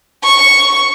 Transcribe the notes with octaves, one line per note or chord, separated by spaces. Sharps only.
C#6